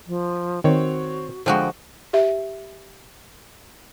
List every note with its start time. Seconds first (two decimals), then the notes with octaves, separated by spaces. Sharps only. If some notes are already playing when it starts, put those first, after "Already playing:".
0.07 F3
0.64 D#3 C4 F#4 C#5
1.46 D3 F3 G#3 F#4 G5 F#6
2.13 G4 E5